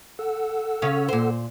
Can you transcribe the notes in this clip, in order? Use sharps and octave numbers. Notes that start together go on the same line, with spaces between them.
A4 F#5 E6
C#3 C#4 F5
A#2 C5